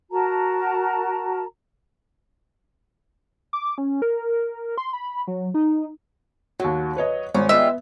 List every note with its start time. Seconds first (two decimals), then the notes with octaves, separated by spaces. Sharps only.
0.10 F#4 A#4 A5 A#5
3.53 D6
3.78 C#4
4.02 A#4
4.78 C6
4.93 B5
5.27 F#3
5.54 D#4
6.60 D#2 F#3 F#4
6.97 B4 C#5 D#5
7.34 G#1 C#4
7.49 G3 G#3 B3 F4 E5